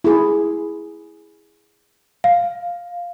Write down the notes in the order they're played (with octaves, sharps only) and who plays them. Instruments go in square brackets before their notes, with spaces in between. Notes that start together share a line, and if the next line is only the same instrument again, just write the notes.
[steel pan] E4 G#4
[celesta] F5